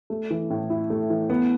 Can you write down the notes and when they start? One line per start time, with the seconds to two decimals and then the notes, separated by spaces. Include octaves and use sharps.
0.10 A3
0.30 E3
0.50 A2
0.70 E4
0.90 A3
1.10 E3
1.30 B3